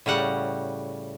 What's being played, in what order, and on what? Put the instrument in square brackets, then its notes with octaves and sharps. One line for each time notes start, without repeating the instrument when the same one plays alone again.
[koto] A2 C#3 G3 F#5